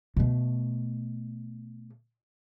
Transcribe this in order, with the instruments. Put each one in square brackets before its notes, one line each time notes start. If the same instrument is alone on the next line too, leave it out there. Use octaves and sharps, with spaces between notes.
[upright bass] B2 A3